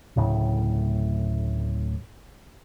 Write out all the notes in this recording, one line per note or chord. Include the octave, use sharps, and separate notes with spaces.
D1 A2 C#3